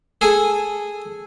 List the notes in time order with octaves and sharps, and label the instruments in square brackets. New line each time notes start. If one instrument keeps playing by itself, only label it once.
[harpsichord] G#4 A4 G#5